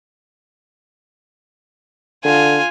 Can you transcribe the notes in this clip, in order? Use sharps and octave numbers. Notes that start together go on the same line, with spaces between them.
D3 F4 G#5